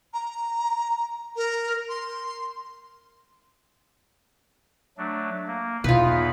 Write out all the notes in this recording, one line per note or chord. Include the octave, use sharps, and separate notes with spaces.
A#5
A#4
C6
F#3 A3 D4
A#3
E2 B2 D#4 F4 B4 B5